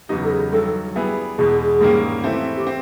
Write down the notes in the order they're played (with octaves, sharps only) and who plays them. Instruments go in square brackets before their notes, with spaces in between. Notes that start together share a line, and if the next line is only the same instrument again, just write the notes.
[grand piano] E2 C#3 F#3 B3 D#4 [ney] G4
[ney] A4
G#4
[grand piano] G2 D#3 F#3 [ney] A4
[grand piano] G3 B3 E4 G#4 B4
[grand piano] E2 B2 G#3 [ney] G#4
[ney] G#4
[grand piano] G#2 D#3 G3 A#3 C#4
E3 A3 C4 E4 G4
[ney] G4
[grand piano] C4